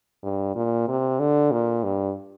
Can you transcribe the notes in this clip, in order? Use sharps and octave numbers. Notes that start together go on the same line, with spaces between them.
G2
A#2
C3
D3
A#2
G2